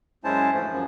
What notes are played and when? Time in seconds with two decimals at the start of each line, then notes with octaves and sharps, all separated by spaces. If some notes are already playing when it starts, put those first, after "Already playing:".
0.24 F#2 G#3 C#4 E4 C5 A5
0.52 D2 G#2 E3 F3 A3
0.72 F#2 F3